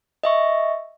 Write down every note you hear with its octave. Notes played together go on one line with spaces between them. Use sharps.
D#5 E5 C#6